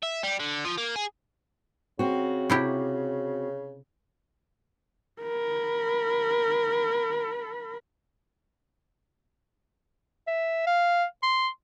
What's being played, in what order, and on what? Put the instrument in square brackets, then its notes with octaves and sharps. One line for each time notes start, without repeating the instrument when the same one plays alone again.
[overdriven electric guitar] E5
G3
D3
F3
A#3
G#4
[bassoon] C#3 [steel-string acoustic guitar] C4 F#4
[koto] C3 E4 G4
[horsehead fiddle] A#4 B5
[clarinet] E5
F5
C6